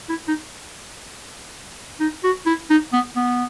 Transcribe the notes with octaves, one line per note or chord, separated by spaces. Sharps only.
E4
D#4
D#4
F#4
E4
D#4
B3
B3